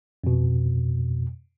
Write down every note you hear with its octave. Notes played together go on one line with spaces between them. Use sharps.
F2 B2